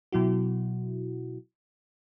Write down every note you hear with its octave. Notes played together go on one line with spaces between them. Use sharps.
B2 F#3 E4 F#4